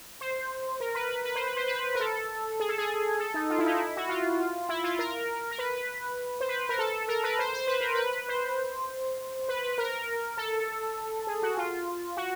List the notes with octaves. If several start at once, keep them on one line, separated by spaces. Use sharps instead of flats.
C5
A#4
B4
B4
B4
C5
B4
C5
B4
A#4
A4
G#4
A4
G#4
A4
D#4
F4
E4
D#4
E4
F#4
F4
E4
F4
A#4
A#4
B4
B4
C5
B4
A#4
A4
A#4
B4
C5
C5
B4
A#4
B4
C5
B4
B4
A#4
A4
G#4
F#4
F4
F#4